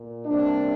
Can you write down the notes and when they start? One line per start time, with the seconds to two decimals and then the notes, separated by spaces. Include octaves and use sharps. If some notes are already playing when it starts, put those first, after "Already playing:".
Already playing: A#2
0.26 C3 G3 A#3 D4